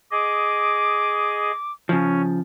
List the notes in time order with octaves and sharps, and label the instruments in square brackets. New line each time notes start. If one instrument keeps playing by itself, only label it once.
[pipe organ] G#4 D#5 [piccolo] D6
[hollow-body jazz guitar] C#3 F3 [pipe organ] C#4